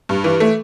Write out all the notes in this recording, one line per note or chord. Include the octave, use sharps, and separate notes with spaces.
G2
E3
A3